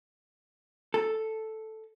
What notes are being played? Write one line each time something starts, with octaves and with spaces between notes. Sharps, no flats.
A4